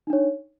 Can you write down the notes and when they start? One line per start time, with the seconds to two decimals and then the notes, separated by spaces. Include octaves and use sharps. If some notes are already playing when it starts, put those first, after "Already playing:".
0.07 D#4
0.10 D4
0.13 C#5